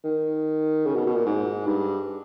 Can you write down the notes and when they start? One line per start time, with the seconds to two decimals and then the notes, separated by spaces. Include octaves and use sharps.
0.04 D#3
0.86 C#3
0.95 B2
1.06 B2
1.16 A#2
1.26 G#2
1.66 G2